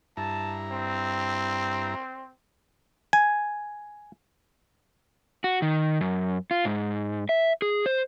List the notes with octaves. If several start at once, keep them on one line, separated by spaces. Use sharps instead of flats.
G2 E4 A5 A#5
C4
G#5
F#4
D#3
F#2
F4
G#2
E5
G#4
C5